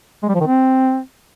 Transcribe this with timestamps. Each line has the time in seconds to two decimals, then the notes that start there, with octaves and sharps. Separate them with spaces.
0.23 G#3
0.29 G3
0.35 F3
0.41 D#3
0.47 C4